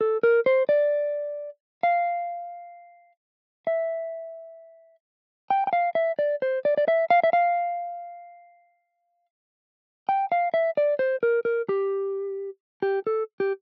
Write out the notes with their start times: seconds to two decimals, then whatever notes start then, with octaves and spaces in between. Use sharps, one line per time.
0.01 A4
0.23 A#4
0.46 C5
0.69 D5
1.83 F5
3.67 E5
5.50 G5
5.67 G5
5.73 F5
5.95 E5
6.19 D5
6.42 C5
6.65 D5
6.77 D5
6.88 E5
7.10 F5
7.24 E5
7.33 F5
10.09 G5
10.32 F5
10.54 E5
10.77 D5
10.99 C5
11.23 A#4
11.45 A#4
11.69 G4
12.82 G4
13.07 A4
13.40 G4